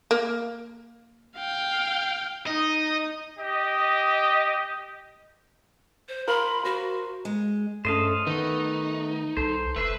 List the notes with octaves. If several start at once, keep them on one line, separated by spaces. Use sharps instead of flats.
A#3
F5 G5
D#4 D#5
G4 D#5
C5
A#4 F5 B5 C6
F#4 C5
G#3
G2 A3 C#4 A4 C5 D#5 F5
D#3 A3 B3 D#4 B4
C2 A4 C5
F1 A3 B4 C5 E5